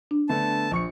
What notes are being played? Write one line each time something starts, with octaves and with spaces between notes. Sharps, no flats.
D4
D3 A3 B3 A5
A#1 C#6 C#7